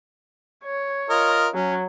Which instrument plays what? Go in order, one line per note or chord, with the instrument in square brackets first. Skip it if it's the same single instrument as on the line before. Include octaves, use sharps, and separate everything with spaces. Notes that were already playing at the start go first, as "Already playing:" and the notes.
[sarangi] C#5
[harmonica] F4 A#4 D#5
[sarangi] F#3 [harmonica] C#4